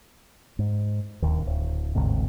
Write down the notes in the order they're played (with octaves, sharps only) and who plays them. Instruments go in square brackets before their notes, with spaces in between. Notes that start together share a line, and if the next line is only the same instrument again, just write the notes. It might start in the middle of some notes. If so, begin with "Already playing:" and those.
[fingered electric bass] G#2
D1 D#2
D1
G1 D2 G#2 C3